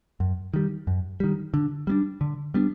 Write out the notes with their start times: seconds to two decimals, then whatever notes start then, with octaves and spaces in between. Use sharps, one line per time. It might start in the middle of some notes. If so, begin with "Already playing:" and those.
0.20 F#2
0.54 D#3 G3
0.87 F#2
1.20 D#3 G3
1.54 D3
1.87 G3 B3 D4
2.21 D3
2.54 G3 B3 D4